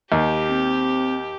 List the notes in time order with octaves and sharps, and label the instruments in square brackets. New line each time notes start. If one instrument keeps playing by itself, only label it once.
[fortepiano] D#2 [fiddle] G4
[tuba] C4